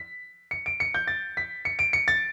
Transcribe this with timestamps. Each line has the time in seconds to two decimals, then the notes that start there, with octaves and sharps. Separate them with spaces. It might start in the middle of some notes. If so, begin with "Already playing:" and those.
Already playing: B6
0.51 C#7
0.66 D7
0.80 C#7
0.94 G6
1.07 A6
1.37 B6
1.65 C#7
1.79 D7
1.93 C#7
2.08 A6